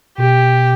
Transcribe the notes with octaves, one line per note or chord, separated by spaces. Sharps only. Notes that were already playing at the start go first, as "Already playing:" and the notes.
B2 G4